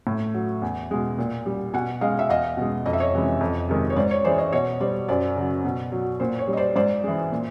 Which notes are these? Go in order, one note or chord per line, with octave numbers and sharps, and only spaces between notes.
A2
F#3
E2
B2 G#3
A#2
G3
B2 F#5 G#5
G#3 D#5 F5
E5
E2 D#5 F5
B2 G#3
F2 D#5
E5
C#5 D#5
C3 E3 G#3
F2
C3 D#3 G#3
C#5
G#2 C5 D5
C#5
E3 G#3 C5 D5
C#5 D#5
B2 C#5 D#5
G3 C5 D5
F#2 C5 D5
C#3 F#3
B2
F#3
A#2 C5
C#5
G3
D#5
C5 D5
G#2 C5 D5
E3 G#3
A#2